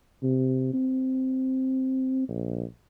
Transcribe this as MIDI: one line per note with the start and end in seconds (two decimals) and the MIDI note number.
0.23 0.69 48
0.73 2.26 60
2.28 2.64 34